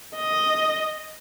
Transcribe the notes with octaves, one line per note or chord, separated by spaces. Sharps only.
D#5